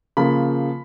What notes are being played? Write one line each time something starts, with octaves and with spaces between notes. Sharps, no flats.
C#3 F3 A#3 B5